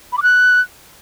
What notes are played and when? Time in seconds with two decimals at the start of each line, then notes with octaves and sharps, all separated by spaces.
0.12 B5
0.18 D6
0.23 F#6